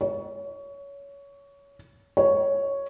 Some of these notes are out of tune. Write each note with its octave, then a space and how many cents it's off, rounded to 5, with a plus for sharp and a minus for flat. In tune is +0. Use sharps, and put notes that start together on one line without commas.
C#5 +20
C#5 +0